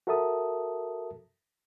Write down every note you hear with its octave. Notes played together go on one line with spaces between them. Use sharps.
F#4 A4 A#4 E5 A5 D#6